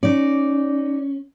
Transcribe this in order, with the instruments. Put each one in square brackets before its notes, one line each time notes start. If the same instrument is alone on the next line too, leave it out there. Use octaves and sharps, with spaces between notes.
[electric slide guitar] C#4 [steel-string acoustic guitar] D#4 D5